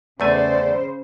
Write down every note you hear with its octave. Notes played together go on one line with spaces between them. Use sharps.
E2 C#3 A3 C5 D5 G#5